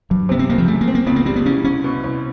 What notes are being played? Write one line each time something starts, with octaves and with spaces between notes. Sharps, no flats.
G2 F#3
C3 B3
C4
C#2 A#3
F3
F#2 A3
A#3
C4
A#3
C#2 B3
A#3
G3 C4
B3
C2 C#4
C2 C#4
B2
C2